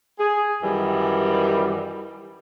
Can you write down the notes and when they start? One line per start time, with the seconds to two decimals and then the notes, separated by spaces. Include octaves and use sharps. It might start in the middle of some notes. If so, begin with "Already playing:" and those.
0.19 G#4
0.63 F#2 D#3 E3 G3